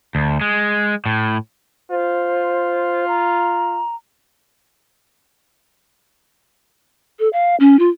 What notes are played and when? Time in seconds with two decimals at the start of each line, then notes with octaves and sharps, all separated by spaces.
0.15 D2
0.41 G#3
1.06 A2
1.91 F4 C5
3.08 A#5
7.19 A4
7.33 F5
7.60 C#4
7.79 F4